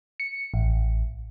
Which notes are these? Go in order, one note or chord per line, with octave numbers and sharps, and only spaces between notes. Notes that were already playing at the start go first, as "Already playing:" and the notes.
C#7
A1